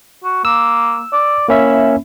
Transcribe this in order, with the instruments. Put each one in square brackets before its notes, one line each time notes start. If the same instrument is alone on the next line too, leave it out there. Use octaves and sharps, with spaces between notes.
[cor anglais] F#4
[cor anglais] A#3 [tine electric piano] E6
[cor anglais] D5
[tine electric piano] A#3 C#4 E5 [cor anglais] E4